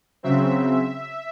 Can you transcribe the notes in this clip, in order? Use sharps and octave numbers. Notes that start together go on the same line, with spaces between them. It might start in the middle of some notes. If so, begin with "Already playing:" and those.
C#3 F#3 C4 E5